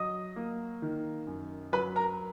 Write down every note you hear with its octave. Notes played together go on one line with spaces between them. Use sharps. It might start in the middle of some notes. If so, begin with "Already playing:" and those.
Already playing: F#3 D#5 D#6
A#3
D#3
F#2
F#3 B4 B5
A#4 A#5